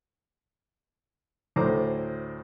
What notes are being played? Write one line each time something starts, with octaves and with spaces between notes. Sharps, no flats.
D2 A2 C5 A#5 D6